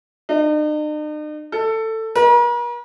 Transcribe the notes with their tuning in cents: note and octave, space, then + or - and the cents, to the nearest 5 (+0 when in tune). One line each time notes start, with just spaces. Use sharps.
D#4 -45
A4 +15
A#4 +45